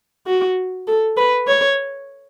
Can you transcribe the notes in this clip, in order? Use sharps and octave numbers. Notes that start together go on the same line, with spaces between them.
F#4
A4
B4
C#5